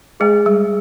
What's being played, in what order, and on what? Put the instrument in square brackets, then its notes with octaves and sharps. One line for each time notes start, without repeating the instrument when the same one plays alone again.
[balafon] G#3 [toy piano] G#4 C5 D#5 G#5
[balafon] G3